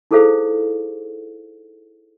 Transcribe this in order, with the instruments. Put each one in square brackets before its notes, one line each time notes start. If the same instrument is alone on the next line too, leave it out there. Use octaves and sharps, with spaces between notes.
[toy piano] D#4 E4 G#4 A4 C5 F5